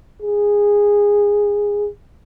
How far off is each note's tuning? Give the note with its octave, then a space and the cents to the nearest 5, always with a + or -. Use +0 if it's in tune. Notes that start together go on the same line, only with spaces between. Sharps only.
G#4 -15